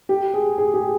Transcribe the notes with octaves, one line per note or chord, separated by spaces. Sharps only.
G4
G#4
G#4
G4